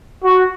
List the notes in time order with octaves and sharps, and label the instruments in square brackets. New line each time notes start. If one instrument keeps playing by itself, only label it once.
[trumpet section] F#4